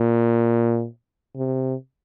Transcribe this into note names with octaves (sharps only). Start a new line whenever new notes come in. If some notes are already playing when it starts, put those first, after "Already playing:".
Already playing: A#2
C3